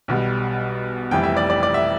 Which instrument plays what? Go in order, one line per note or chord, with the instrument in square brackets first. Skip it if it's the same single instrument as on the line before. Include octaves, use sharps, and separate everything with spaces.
[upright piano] B1 B2 G3
F1 F2 E3 G3 G5
E5
D5
D5
D5
E5